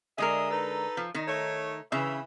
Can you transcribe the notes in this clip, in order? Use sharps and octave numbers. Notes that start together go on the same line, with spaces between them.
D3 G#3 G#4 A#4 D#5 E5
D#4 A4 B4
F3
D#3 D#4
A3 C#5
C#3 E3 E5